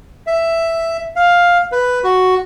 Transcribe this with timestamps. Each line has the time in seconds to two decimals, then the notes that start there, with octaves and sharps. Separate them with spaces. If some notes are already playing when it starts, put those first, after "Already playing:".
0.27 E5
1.16 F5
1.72 B4
2.04 F#4